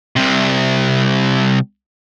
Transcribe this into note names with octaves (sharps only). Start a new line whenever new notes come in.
C2 C3